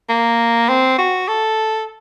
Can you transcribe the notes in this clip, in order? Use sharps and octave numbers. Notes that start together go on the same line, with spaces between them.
A#3
C4
F#4
A4